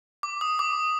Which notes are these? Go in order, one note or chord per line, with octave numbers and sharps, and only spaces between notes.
D6
D#6
D6